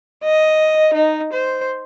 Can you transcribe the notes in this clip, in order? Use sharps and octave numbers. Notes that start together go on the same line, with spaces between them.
D#5
D#4
C5